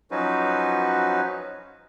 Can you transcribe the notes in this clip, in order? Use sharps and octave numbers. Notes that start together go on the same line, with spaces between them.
F3 F#3 C#4 D#4 F#4 B4